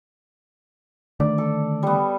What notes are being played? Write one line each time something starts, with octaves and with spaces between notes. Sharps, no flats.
D3 D#3 A3 D5
A4
G3 B3